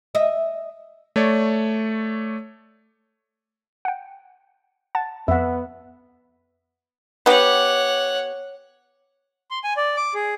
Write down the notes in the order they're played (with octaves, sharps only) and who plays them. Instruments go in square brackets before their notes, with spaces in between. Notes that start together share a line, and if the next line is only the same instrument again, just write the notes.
[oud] D#5 E5
[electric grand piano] A3 C#5 D5
[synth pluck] F#5 G5
F#5 A5 A6
[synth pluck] F2 [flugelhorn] B3 [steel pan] E5 F#5
[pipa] B3 G4 [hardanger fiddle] C#5 F#5
[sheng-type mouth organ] C6
G#5
D5
D6
G#4